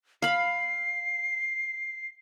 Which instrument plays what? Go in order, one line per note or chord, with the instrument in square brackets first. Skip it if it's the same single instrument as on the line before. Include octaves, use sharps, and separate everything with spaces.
[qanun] F5 B5 [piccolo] C7